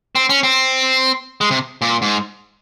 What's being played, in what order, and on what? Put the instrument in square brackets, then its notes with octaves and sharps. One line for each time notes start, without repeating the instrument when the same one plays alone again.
[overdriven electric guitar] C4
C#4
C4
G#3
C3
A#2
G#2